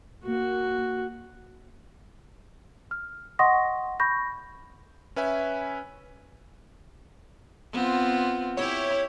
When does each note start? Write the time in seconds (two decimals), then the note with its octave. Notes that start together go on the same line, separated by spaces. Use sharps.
0.24 A#3 F#4
2.91 F6
3.39 D#5 F#5 C6 C#6 D#6 A#6
4.00 B5 C#6 G6 A#6
5.16 C#4 B4 E5 G#5
7.73 B3 C4 F4
8.57 E4 G4 C#5